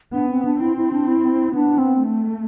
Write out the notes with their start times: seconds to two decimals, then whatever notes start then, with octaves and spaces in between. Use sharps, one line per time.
0.13 B3 D4
0.29 C4
0.45 D4
0.61 C4 E4
0.77 E4
0.93 D4
1.07 E4
1.55 B3 D4
1.78 C4
2.02 A3